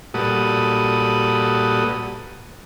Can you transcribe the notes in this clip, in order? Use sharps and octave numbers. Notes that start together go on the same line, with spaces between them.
A#2 G3 F#4 A4 B4 D#6